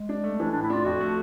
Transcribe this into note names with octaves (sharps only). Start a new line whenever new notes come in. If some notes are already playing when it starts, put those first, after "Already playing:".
Already playing: G#3
D4
A3
E3 D4
A2 D4
E4
D4 F4
F2 F#4
A3